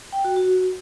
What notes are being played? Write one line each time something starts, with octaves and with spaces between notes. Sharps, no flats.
G5
F#4
F#4